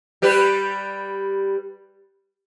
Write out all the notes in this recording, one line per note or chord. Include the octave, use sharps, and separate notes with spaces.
G3 G4 B4